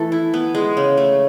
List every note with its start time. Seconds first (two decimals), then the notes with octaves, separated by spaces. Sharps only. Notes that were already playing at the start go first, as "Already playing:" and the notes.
Already playing: E3 A3 A4
0.12 E4
0.34 B3
0.55 G#3
0.77 C#3
0.97 A3